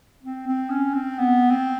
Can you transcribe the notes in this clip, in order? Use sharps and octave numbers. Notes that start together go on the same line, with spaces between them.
C4
C4
C#4
C4
B3
C4